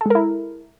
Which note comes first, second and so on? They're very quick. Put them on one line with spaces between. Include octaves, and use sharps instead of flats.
A4 G#3 A#4 E4